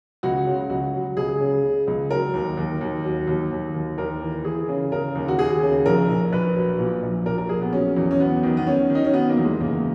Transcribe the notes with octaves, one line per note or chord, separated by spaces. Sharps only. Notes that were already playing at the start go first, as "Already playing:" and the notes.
C#2 F#4
C#3
C#2 F#4
F#3
C#2 G#4
C#3
C#3
C#2
F#3 A#4
D#2
D#2
D#2
F#3
D#2
D#2
D#2
D#2 A#4
E3
E3 G#4
C#3
C#3 A#4
D#2
F#4
D#2 G#4
C#3
A#1 A#4
A#1
A#1 B4
F#3
A#2
A#1
A#2 A#4
A#4
A#1 G#4
B3
F#3 C#4
E2
C#4
F#3 B3
D#3
B3
D#3 C#4
D#3
D#4
C#4
F#3 B3
A#3
E2
G#3
F#1 A#3